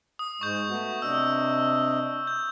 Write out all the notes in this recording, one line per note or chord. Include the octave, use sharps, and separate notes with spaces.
D#6
G#2 G#3 C#6 G6
A3 B3 F#4
C3 D4 D#5 E6
G6